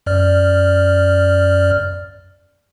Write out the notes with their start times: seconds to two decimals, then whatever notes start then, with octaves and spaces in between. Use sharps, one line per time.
0.06 F#2 D5 F6